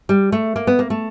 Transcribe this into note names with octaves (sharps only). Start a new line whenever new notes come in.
G3
A3
A#3
B3
A#3
A3